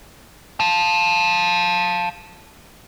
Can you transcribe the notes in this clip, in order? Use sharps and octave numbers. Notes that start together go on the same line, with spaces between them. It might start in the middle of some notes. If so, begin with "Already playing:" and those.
F5 A5